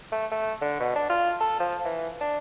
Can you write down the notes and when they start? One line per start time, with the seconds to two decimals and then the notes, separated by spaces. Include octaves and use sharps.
0.12 A3
0.32 A3
0.62 D3
0.80 B2
0.96 D4
1.10 F4
1.41 A4
1.60 F3
1.85 E3
2.21 D4